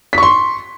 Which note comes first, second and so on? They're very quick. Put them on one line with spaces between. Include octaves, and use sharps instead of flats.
B6 C#6 C6